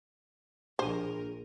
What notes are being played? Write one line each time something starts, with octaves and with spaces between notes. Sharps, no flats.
A#1 D4 G#4 A#4 C5 D#7